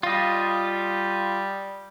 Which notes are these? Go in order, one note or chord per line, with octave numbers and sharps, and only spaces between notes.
G3 F4 D#5